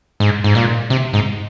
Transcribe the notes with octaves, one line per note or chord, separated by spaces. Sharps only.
G#2
G#2
A#2
C3
G#2